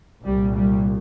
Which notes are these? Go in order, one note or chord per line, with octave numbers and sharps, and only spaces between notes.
C2 A#2 G3
G3